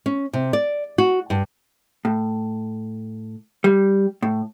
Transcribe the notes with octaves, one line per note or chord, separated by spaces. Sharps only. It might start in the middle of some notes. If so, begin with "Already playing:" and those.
C#4
C3
D5
F#4
G2
A2
G3
A2